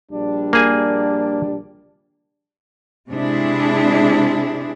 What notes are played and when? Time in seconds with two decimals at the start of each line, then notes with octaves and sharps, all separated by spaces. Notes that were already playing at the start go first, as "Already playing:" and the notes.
0.11 A#1 G3 D4
0.53 A#3 G#4 G#5
3.11 C3 G#3 D4 E4 G#4